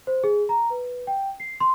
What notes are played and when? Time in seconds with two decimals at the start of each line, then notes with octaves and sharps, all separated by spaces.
0.07 C5
0.24 G#4
0.49 A#5
0.70 B4
1.07 G5
1.40 C7
1.60 C6